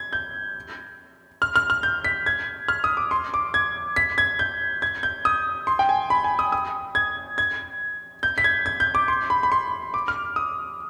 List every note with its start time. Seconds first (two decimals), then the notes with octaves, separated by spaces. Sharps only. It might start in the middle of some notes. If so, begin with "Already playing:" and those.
Already playing: G#6
0.13 G6
1.42 F6
1.56 F6
1.70 F6
1.83 G6
2.05 B6
2.26 G#6
2.68 F6
2.84 D#6
2.97 D6
3.11 C6
3.34 D6
3.54 G#6
3.96 B6
4.18 G#6
4.39 G6
4.82 G#6
5.03 G6
5.25 D#6
5.67 C6
5.79 G5
5.89 G#5
6.10 B5
6.24 G#5
6.39 D#6
6.52 D#6
6.95 G#6
7.38 G#6
8.23 G6
8.38 B6
8.44 G#6
8.66 G#6
8.80 G6
8.95 D6
9.08 C6
9.30 B5
9.43 B5
9.52 C6
9.94 D6
10.08 F6
10.36 D#6